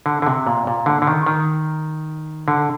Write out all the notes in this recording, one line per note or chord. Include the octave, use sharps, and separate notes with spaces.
D3
D3
C3
A#2
A#2
D3
D3
D#3
D#3
D3